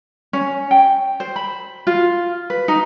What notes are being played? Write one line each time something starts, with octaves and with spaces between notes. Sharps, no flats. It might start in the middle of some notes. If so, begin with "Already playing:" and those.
C#4
G5
C5
B5
F4
B4
D#4